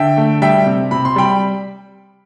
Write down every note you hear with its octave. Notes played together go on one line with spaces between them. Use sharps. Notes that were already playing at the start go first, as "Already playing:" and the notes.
Already playing: D3 E5 G5
A3
G3 E5 G5
C3
C3 B5
C6
G3 G5 B5